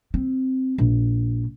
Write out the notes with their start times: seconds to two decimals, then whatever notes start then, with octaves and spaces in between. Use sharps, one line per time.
0.14 C4
0.78 A#1